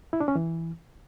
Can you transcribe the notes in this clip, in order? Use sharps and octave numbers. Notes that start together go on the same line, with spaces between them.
E4
D4
C#4
E3